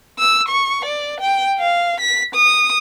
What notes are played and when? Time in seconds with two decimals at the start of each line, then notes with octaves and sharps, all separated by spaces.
0.19 E6
0.49 C#6
0.85 D5
1.21 G5
1.60 F5
2.01 B6
2.35 D#6